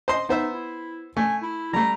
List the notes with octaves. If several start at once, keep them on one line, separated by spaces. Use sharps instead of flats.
C5 D#5 C6
B3 D#4 C5 E5
E4
A3 G#5
E4
G3 A3 A#5